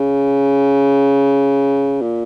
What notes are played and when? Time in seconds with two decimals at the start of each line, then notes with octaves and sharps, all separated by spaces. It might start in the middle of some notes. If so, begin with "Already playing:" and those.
Already playing: C#3
2.01 A#2